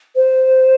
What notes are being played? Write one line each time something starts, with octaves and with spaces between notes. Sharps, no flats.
C5